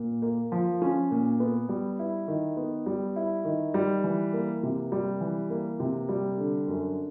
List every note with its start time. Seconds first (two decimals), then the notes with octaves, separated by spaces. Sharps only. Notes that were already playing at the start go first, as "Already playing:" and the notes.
Already playing: A#2
0.22 A#3
0.52 F3
0.82 C#4
1.11 A#2
1.40 B3
1.69 G3
1.99 E4
2.28 D#3
2.57 B3
2.86 G3
3.16 E4
3.45 D#3
3.74 G3
4.04 E3
4.33 A#3
4.63 C3
4.92 G3
5.21 E3
5.50 A#3
5.80 C3
6.09 G3
6.38 D3
6.68 F#2